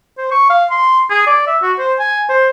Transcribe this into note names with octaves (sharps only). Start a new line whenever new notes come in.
C5
C#6
F5
C6
G#4
D5
E5
F#4
C5
G#5
C5